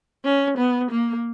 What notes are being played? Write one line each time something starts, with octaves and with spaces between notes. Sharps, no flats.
C#4
B3
A#3